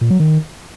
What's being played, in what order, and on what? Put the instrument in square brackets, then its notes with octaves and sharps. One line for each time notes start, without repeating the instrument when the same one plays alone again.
[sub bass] A#2
F#3
D#3